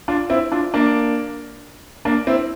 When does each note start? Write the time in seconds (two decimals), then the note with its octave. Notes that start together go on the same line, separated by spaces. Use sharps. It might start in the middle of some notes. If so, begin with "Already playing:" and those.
0.08 D4 F4
0.30 C4 E4
0.52 D4 F4
0.74 A#3 D4
2.05 A#3 D4
2.27 C4 E4